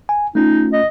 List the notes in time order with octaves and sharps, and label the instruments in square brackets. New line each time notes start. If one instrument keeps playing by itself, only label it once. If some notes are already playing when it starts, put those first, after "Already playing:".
[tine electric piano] G#5
[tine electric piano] A3 C#4 F4 [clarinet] D#4
[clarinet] D#5